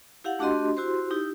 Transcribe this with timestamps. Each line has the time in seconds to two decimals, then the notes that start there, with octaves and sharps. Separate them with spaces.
0.24 E4 G4 F5 F#5
0.39 A3 D4 F#4 G4 D#5 C6
0.77 E4 F#4 G4 C5 C6
1.11 D#4 E4 G4